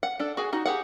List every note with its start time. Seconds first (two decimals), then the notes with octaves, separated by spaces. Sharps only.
0.03 F#5
0.19 D4 A4
0.37 F#4 G#4 G#5
0.53 D#4 F#4
0.65 G4 G#4 F#5